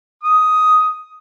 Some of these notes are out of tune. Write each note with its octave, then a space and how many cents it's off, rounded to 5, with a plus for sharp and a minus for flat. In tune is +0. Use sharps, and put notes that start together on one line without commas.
D#6 +5